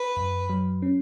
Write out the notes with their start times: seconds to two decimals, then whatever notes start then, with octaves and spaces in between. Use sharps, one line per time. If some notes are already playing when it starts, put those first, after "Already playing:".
Already playing: B4
0.17 F#2
0.50 F#3
0.82 C#4